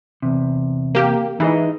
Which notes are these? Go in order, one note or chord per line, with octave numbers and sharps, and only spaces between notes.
E2 C3
A#3 G4
E3 D#4 G#4 D#5